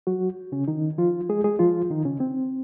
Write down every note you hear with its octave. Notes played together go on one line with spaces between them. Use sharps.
F#3 F#4
C#3 C#4
D#3 D#4
F3 F4
G#3 G#4
G#3 G#4
F3 F4
D#3 D#4
C#3 C#4
C4